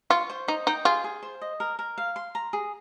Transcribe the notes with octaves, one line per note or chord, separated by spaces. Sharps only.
F4 C#6
C5
D#4 D#5
D#4 G5
F4 G#4
G#4
C5
D#5
A#4
A#4
F5
C6
A#5
G#4